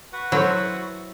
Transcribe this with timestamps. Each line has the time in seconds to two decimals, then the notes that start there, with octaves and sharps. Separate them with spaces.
0.13 F#4 B4 F#5
0.32 F#3 E4 A4 C5